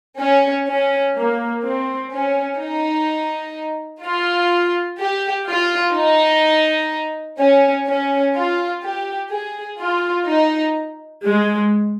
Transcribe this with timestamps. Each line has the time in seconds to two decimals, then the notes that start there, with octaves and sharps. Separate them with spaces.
0.19 C#4
0.67 C#4
1.15 A#3
1.62 C4
2.11 C#4
2.59 D#4
4.03 F4
4.99 G4
5.48 F4
5.95 D#4
7.39 C#4
7.87 C#4
8.35 F4
8.83 G4
9.31 G#4
9.79 F4
10.28 D#4
11.23 G#3